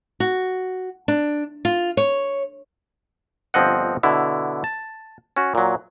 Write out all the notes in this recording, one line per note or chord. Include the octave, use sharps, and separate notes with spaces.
F#4
D4
F4
C#5
G1 F3 C4 D#5 F#5
B2 D3 E4
A5
C#4 F#4
A#2 F#3